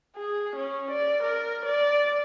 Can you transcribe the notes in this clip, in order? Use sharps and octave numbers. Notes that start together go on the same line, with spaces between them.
G#4
C#4
D5
A#4
D5